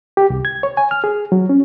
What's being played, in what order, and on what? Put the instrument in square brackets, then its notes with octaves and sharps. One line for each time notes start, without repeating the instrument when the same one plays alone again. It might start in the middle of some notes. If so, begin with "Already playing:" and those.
[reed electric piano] G4
C2
G#6
C#5
G#5
F6
G#4
F#3
C#4